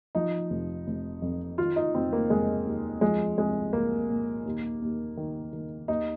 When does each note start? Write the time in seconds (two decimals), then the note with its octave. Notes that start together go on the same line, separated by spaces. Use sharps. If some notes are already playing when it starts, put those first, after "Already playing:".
0.15 F3 D#4
0.50 F1
0.87 F1
1.22 F2
1.58 D#3 F4
1.76 D#4
1.94 F1 C4
2.13 A#3
2.30 F1 G#3
2.66 D#2
3.01 F3 G#3
3.38 C2 G#3
3.73 C2 A#3
4.10 A#2
4.46 D#2
4.82 D#2
5.17 D#3
5.53 D#3
5.88 D#2 D#4